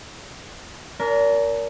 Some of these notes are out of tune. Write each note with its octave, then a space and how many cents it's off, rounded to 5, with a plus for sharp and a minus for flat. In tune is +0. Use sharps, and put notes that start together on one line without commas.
D4 -40 A#4 +0